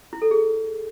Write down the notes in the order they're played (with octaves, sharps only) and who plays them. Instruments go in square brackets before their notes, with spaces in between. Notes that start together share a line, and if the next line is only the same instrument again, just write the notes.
[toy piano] E4
A4
G#4